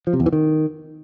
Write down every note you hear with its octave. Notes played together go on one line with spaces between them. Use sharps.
F3
C3
E2
E3
D#3